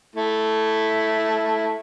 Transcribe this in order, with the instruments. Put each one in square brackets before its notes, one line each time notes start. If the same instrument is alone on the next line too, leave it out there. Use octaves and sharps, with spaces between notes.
[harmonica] A3 E4